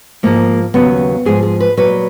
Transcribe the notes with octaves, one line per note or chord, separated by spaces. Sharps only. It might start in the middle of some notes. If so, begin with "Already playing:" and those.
G#2 F3 G#3 A#3
D#2 C#3 F#3 B3
G#2 F3 G#3 G#4
G#4
B4
A#2 F#3 B4